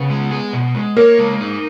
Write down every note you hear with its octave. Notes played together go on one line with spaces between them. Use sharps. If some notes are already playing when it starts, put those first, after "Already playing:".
Already playing: C#3 B3
G#3
G#4
B2
G#3
A#3 A#4 C#5
G#3
D#4